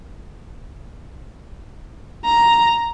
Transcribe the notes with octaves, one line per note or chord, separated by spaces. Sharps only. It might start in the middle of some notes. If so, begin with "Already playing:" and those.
A#5